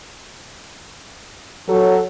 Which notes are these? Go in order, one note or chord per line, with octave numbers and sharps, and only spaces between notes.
F#3 A4